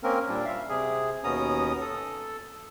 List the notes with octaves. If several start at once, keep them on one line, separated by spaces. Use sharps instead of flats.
A#3 C4 C#4 A#4
A#2 G3 D4
E5 F5
C3 G#4
D#2 B2 B3 C#4 A#5 D#6
A4